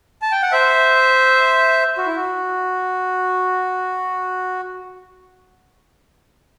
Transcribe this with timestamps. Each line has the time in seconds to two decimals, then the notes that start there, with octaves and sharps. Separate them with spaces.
0.22 A5
0.32 G5
0.42 F#5
0.52 C5 E5
1.98 F#4
2.07 E4
2.16 F#4